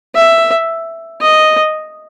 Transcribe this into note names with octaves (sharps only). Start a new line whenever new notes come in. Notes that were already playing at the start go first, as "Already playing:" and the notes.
E5
D#5